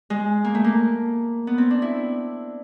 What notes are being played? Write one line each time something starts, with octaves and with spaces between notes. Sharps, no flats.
G#3
A#3
A3
A#3
B3
C4
D4
E4